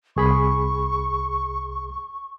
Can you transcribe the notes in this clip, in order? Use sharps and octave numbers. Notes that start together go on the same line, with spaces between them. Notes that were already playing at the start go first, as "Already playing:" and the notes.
C2 G#4 B5 C#6